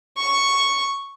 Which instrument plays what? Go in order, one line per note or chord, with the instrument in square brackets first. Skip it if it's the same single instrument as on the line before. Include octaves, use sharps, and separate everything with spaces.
[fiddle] C#6